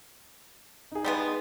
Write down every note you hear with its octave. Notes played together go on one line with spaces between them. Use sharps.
D#4 G#4
G3 G#3 B3